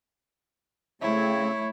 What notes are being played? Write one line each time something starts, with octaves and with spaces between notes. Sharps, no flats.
C#3 A3 C4 E4 C#5